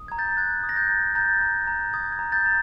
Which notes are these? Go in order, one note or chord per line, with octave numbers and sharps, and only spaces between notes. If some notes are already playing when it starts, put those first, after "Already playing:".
Already playing: D#6
A#5 G#6
G6 A6
F#6 G#6
D#6
A#6
G6 A6
A#5
A#5 G6 A6
A#5
A#5
D#6 G#6
G#6
A#5
G6 A6
A#5